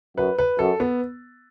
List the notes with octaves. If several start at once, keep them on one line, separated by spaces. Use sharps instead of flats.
F#2 B4
B4
F#2 A4
B3